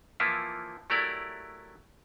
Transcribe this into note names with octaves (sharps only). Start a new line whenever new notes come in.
E3 F3 A#3 E4 F4
F#3 A3 E4 G4 A#4 D5